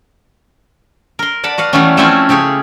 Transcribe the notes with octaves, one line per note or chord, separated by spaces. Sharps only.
A#4 C6
D5 F#5 A5 B5
F#4 B4 F5 F#5
E3 G3 A3 B3 C#4
F3 A3 C4 C#4 E4 F4
C#3 G4 G#4 C#5